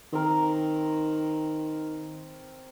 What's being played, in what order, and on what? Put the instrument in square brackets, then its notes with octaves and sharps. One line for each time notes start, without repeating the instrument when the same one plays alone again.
[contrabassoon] D#3 [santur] C4 A#4